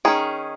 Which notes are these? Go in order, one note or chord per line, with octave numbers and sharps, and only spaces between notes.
D#3 C#4 G#4